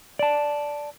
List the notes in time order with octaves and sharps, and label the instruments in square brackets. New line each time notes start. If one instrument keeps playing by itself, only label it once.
[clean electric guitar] D5 A5